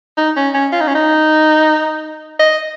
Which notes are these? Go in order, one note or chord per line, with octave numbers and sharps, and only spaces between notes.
D#4
C#4
C#4
F4
D#4
C#4
D#4
D#5